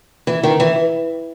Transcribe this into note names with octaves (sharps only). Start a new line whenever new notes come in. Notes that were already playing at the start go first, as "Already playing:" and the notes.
E3
D#3
E3